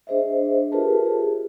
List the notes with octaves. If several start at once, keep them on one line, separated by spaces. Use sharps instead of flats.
D4 G#4 C5 D#5 E5
F4 G4 G#4 A#4 B4 A5
G#4